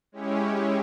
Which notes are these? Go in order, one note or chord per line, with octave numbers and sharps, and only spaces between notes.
G#3 C#4 E4 G4 C#5